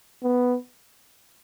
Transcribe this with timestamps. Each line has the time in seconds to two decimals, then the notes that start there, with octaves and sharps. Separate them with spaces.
0.24 B3